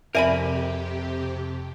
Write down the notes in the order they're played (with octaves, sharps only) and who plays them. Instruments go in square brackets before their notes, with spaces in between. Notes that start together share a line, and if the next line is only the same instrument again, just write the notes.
[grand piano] F2 [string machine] C3 G4 [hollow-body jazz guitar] A#4 G#5 B5 [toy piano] D5 E5